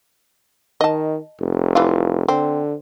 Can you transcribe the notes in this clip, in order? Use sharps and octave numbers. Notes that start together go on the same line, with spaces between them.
D#3 D#5 A5
F1
E3 F4
D3 C4